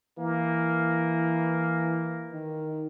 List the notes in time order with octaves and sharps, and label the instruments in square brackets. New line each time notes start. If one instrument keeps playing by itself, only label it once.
[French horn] E3 [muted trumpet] A#3
[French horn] D#3